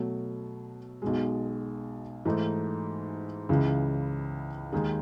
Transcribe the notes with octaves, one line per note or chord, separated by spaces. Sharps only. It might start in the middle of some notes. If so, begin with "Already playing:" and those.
Already playing: B2 F#3 A3
B1 B2 G#3
G#2 E3 A3 D#4
C#2 C#3 E3
D#2 D#3 G#3 D#4 G#4